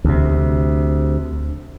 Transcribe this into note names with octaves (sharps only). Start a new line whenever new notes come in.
D2 C3